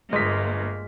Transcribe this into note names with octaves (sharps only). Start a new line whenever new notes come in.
G1 G2 G#3 A#3 F4 D#5 B6